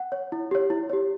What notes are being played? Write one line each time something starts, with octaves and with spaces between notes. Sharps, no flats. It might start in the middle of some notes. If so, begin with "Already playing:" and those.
Already playing: F#5
C#5
E4
G4 C#5
E4
G4 C#5